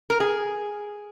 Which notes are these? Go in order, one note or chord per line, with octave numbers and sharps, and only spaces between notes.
A#4
G#4